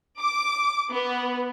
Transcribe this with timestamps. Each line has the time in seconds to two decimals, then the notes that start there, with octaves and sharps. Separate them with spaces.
0.19 D6
0.91 B3